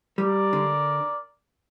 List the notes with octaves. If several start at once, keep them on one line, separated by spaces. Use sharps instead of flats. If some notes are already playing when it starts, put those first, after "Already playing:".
G3 A#4 D5
D3